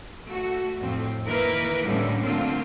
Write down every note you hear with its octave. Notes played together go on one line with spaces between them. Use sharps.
A3 F#4
F2 A2 C4
D#3 E3 A#3 A#4 B4
A2 D3 E3 G3 A#3 C#4
D3 F3 A3 A#3 C4 F4